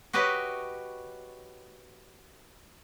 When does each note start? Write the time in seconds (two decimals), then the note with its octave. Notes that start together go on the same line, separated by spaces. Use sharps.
0.13 F#4 G4 B4 C#5 D#5